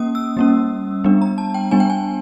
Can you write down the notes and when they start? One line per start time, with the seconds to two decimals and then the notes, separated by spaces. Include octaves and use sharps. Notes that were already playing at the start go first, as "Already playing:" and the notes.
Already playing: A#3 C#4 D#6
0.15 E6
0.37 G3 A#3 C#4
1.04 G3 B3 D4
1.22 A#5
1.38 A5
1.54 G5
1.71 G3 B3 D4 G#5
1.80 G5
1.90 G#5